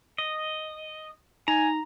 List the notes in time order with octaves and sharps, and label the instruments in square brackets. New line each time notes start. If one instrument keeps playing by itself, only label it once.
[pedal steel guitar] D#5
[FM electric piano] D#4 [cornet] G#5 [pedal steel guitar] A#5